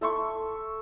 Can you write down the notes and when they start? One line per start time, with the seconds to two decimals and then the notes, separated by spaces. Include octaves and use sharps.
0.01 A4 E5 C6 C#6